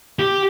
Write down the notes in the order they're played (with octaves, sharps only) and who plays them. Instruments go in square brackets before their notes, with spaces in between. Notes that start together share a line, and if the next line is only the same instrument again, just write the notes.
[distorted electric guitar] G4